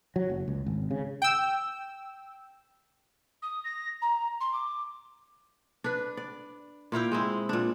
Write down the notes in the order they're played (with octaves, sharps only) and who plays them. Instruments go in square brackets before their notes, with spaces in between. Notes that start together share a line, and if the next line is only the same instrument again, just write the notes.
[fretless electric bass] F#3
F#1
C#2
G#1
C#3
[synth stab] G5 E6
[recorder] D#6
A#6
A#5
C6
D6
[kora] D4 B4
D5
A#2 E4 F5 G5
G#3 C4 E4
A#2 D4